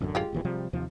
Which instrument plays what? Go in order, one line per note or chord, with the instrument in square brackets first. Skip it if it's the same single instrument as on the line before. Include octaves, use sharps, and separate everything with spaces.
[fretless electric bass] A1 F#2 D3
[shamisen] G#3 F4 G4
[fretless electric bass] D#1 D#2 E3
C3 F3 G3
D#2 C3 F3